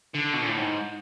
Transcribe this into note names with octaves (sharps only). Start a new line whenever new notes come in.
D3
B2
A#2
A2
G#2